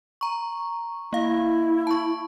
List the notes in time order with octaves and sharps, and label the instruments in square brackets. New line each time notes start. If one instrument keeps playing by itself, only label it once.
[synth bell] A#5 C#6
[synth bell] A#3 F5 [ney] E4
[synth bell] A5 C#6